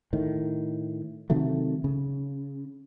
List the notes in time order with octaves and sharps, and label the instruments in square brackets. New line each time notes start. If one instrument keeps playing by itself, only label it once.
[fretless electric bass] A2 D#3
C3 D#3 F#3 A3
C#3